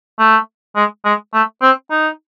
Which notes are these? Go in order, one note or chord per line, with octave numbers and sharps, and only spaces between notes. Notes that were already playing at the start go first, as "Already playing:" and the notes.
A3
G#3
G#3
A3
C4
D#4